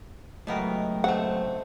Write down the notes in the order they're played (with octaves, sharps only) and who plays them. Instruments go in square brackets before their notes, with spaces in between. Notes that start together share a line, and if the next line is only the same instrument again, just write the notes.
[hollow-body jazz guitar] C#2 F#2 A2 [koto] A3 B3 A#4 [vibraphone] D#5 G5
[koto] A3 C4 [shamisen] F#5